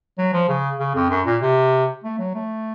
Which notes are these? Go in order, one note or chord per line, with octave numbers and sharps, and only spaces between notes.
F#3
F3
C#3
C#3
F2
F#2
A#2
C3
A3
F#3
A3